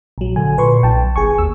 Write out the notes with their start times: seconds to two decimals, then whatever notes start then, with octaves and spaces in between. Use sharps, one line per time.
0.18 A#1 F#3
0.36 D3 G#5
0.58 A#2 B4 C6 C#6
0.83 B1 G5 A5
1.16 G1 G#4 G#5 C#6
1.38 D#2 E6